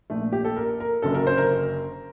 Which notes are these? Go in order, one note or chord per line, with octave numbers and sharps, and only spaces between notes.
A#1 A#2 A3
G4
A4
A#4
A#4
F#1 F#2 D3 A4
A#4
C5
A#4